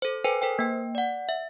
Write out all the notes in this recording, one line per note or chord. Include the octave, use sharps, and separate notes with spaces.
A4 C5
A4 B4 C5 G5 G#5
A#4 C5 G5
A#3 G5
D5 F#5
E5